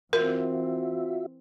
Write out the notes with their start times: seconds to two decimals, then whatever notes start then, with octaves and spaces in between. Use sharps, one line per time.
0.13 E3 C4 F4 F#4 A#4 E5